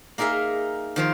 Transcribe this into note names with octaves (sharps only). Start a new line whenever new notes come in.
A#3 D#4 G#4 A#4 E5
D#3 F3 C5